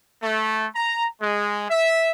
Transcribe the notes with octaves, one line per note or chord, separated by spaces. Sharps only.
A3
A#5
G#3
E5